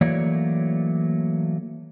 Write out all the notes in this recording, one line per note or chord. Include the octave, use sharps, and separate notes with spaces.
E3 F#3 A3 A#3 C#5 D5